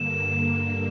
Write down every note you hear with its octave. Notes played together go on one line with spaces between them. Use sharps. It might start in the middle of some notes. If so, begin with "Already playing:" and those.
Already playing: G2 D3 A#3 E7